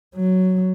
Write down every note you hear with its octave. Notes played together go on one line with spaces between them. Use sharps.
F#3